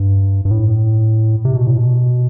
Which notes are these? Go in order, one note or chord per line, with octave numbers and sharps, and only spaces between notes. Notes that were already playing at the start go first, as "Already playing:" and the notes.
Already playing: G2
G2
A2
C3
B2
A2
B2